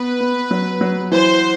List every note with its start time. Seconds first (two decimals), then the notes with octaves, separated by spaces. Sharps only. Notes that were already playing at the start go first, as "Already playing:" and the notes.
Already playing: B3 B4
0.20 B3
0.51 F#3
0.81 F#3
1.12 E3 C5